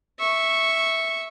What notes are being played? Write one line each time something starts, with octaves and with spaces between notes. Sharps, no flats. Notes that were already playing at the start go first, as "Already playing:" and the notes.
E5 C#6